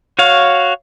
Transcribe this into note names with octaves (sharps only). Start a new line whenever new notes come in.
F#4 C#5 F5